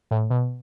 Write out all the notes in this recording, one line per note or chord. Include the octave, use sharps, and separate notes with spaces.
A2
B2